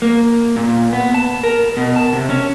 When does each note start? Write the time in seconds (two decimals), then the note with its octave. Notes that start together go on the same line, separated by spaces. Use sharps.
0.02 A#3
0.56 A#2
0.93 B3
1.14 A5
1.43 A#4
1.77 B2
1.96 A5
2.13 C3
2.29 C#4